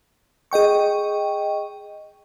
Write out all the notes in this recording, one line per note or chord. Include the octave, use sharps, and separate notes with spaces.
G#4 D#5 G5 C#6